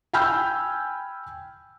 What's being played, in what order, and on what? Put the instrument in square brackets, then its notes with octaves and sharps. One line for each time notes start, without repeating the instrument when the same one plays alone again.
[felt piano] G5 G#5 B5 E6 F6 G6